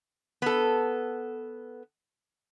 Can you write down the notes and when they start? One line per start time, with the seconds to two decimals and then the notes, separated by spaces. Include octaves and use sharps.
0.42 B3 A4